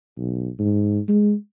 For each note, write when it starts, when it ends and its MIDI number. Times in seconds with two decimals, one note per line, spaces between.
0.17 0.50 35
0.59 1.00 44
1.09 1.34 56